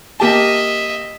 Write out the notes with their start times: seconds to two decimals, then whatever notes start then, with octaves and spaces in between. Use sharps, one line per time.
0.20 A#3 G4 D#5 E5 A5